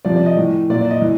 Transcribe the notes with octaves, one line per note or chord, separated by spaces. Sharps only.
C3 F3 D5
D5
D#5
A2 E3
A#2 F#3 D5
D5
D#5
E3